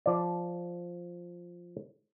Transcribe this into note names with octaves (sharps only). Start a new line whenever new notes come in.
F3 D5